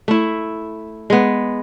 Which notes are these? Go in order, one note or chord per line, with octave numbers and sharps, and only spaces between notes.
A3 E4
G#3 B3